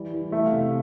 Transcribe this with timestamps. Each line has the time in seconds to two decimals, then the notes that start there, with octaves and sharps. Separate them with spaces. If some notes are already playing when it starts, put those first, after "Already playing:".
Already playing: E3 G3 D5
0.14 E3
0.32 A3 E5
0.46 F5
0.52 C3